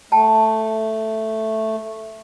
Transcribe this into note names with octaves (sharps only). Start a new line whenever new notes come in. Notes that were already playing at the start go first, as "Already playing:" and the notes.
A3 G5 A5